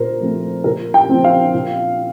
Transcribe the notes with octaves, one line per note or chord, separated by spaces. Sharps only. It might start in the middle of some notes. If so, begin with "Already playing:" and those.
Already playing: A#2 A#4 C5
F3 A3 C4
A#2 A#4
G5
F3 C4
F5
A#2